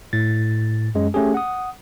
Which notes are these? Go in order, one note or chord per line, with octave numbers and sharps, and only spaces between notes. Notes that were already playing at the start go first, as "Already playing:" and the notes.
A2 A6
F#2 G#3 C#4
A3 C#4 G4 G#4
F#5 D#6